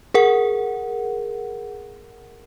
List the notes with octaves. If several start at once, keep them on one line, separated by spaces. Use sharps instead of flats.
G#4 A#4 F#5